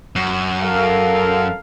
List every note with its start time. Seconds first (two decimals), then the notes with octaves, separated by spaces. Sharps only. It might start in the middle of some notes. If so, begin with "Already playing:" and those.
0.16 F#2
0.63 A4 A#4 F5